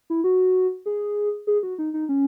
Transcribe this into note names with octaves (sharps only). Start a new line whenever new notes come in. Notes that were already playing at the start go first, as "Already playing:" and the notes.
E4
F#4
G#4
G#4
F#4
D#4
D#4
C#4